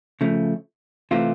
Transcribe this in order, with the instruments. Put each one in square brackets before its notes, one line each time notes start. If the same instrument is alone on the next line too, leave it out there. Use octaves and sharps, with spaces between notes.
[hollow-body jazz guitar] C#3 F3 A3
C3 E3 A3 C4 F4